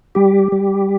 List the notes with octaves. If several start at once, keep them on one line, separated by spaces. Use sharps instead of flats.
G3 G4
G3